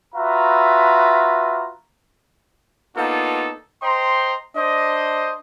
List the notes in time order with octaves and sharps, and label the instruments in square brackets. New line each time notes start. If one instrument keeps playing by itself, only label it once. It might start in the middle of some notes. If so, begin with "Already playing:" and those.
[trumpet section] F4 F#4 B4 E5 A#5
[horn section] A#3 B3 D4 D#4 F4 A4
C5 D#5 G5 A#5 C6
D4 C5 D#5